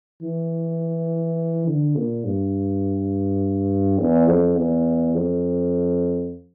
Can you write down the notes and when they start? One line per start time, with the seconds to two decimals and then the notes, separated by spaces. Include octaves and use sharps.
0.22 E3
1.67 D3
1.96 A#2
2.25 G2
3.99 E2
4.28 F2
4.57 E2
5.15 F2